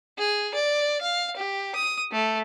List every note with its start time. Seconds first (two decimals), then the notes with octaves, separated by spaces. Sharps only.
0.19 G#4
0.55 D5
1.02 F5
1.37 G4
1.75 D#6
2.12 A3